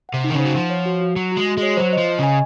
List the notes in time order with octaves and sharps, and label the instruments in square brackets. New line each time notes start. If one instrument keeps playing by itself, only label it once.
[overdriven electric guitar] C3 [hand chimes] F#5
[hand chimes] D#4
[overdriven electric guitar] D#3
[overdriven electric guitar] C#3 [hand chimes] C5
[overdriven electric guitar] F#3
[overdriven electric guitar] F3 [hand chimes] F#5
[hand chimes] C#5
F#4
F#4
[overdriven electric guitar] F#3 [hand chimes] F#4
[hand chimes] F#4
[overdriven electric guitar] G#3
[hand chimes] F#4
[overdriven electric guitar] G#3
[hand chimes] C#5
[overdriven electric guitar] F#3 [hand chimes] C5
[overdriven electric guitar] F3 [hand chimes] D#5
[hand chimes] D#5
[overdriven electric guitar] C#3 [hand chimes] G#5